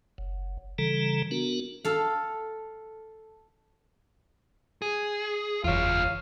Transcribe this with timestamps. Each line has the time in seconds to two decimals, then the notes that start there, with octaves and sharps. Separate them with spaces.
0.18 F#1
0.78 C#3 E3 G3 A4 A#5
1.31 B3 D4 F#4 A#4
1.85 A4 F5
4.82 G#4
5.64 F#1 E2 F4 C#5 F5